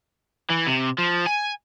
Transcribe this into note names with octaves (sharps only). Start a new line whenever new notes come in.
E3
C3
F3
G#5